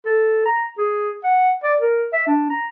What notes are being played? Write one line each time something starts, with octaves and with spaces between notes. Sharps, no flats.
A4
A#5
G#4
F#5
D5
A#4
E5
D4
A#5